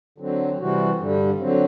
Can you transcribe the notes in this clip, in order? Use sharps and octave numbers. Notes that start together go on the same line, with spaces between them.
D3 F#3 C4
C3 E3 G3 C4 F#4
G2 D3 G3
D3 F#3 C4